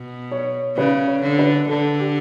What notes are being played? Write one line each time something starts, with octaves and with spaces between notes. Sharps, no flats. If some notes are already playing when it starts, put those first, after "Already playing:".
Already playing: B2
C#5
C#3 B4
C#5
D3
B4
D3 A4
G4